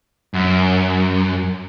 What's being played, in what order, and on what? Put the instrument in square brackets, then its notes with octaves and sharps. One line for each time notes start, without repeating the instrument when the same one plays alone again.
[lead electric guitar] F#2